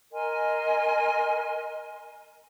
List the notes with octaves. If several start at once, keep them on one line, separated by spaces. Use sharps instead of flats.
A#4 D#5 G#5 C6